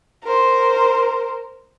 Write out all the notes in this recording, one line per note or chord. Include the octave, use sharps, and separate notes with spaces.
A#4 C5